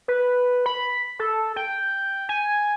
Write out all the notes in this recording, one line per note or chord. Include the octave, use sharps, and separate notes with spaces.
B4
B5
A4
G5
G#5